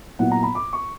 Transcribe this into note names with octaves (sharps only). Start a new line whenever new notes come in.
A#2 F#3 B3 E4 F#5
A#5
B5
D6
C#6